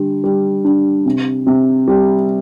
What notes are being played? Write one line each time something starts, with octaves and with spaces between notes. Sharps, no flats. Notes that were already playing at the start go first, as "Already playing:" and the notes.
Already playing: D3 G3
G3
D4
C3
C3
G3